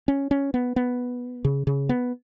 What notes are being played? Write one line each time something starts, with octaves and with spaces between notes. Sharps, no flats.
C#4
C#4
B3
B3
C#3
C#3
B3